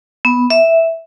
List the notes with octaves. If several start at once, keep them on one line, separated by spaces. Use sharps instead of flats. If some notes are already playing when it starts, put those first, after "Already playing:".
B3
E5